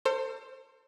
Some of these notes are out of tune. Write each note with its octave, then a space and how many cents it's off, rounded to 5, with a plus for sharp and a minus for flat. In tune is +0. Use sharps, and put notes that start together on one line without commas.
A4 +45 C5 +5